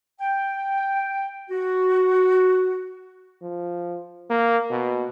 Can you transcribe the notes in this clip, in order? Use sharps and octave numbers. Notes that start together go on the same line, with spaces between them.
G5
F#4
F3
A#3
B2